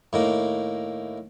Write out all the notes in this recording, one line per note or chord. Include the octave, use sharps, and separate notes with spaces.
A2 D#3 A#3